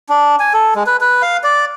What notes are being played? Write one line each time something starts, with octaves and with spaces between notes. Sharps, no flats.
D4
G#5
A4
G#3
B4
B4
F5
D5